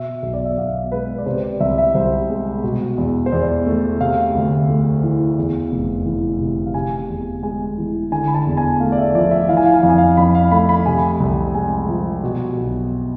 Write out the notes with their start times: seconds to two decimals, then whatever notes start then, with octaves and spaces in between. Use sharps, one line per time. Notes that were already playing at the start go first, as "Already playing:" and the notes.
Already playing: B2 E5
0.23 B1
0.34 D5
0.46 E5
0.57 B1 F5
0.92 G#3 B4
1.18 D5
1.26 C3 C5
1.43 D5
1.60 C2 E5
1.78 E5
1.95 C2 C5
2.29 G#3
2.64 B2
2.98 E2
3.26 C5
3.32 E2 D5
3.67 A3
4.01 C3 F5
4.35 D2
4.69 A3
5.03 E3
5.38 E2
5.72 F1
6.05 E3
6.40 C3
6.66 F5
6.74 C3 G#5
7.08 E2
7.43 G#3 G#5
7.78 E3
8.12 D3 G#5
8.27 B5
8.35 A5
8.47 E2
8.57 G#5
8.80 A3 F5
8.92 D5
8.98 E5
9.14 F3 D5
9.31 E5
9.49 E3 F5
9.57 G#5
9.66 F5
9.74 G#5
9.82 F2 F5
9.90 G#5
9.98 F5
10.17 F2 B5
10.35 F5
10.51 A3 B5
10.69 B5
10.86 C3 G#5
11.20 C2
11.55 G#3 G#5
11.89 F3
12.23 B2
12.57 B1